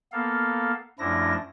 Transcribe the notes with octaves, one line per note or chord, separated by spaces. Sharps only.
A#3 B3 A4 F5
F#2 F3 A3 D4 E4 A#6